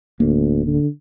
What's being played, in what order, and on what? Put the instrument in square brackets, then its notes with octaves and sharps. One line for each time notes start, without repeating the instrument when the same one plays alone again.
[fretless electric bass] D1 A#3 [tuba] D2
[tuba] D3